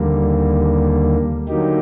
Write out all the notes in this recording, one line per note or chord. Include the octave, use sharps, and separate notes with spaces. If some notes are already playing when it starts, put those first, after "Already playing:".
Already playing: D#2 D3 G3 A#3
D3 F#3 A#3 D#4 G4